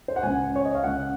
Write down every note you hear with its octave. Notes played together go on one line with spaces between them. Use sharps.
C5
F#5
C#2 C#3 G#5
C#5
D#5
F5
C#2 C#3 F#5